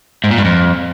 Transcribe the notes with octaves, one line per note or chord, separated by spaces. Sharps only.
G#2
A#2
G2
F2